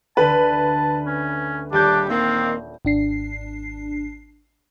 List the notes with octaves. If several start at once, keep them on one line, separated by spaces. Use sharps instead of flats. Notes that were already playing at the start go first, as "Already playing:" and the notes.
D2 D3 B4 A5
C#4
D#1 G3 D4 G4 G6
D#3 A#3 C4
G#1 D4 C7